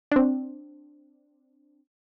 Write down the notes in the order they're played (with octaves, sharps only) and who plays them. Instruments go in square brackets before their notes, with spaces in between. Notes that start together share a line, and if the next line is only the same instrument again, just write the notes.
[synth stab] C4 D4